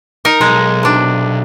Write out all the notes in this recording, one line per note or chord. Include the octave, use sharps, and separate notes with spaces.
D#4 A#4
B1 G#3
C3 D4